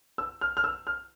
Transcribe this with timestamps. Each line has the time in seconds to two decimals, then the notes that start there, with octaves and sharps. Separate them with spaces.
0.18 E6
0.41 F6
0.57 F6
0.64 E6
0.87 F6